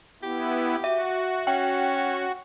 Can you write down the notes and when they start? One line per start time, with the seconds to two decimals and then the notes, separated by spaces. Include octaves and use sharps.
0.23 B3 E4 G4
0.84 F#4 E5
1.47 C#4 G5